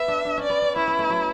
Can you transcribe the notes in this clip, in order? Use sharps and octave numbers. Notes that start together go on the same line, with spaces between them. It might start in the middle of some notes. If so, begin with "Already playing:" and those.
Already playing: B3 E5
D4
D4
C#4 D5
B3
C#4
C#4 E4
B3
A3
F#3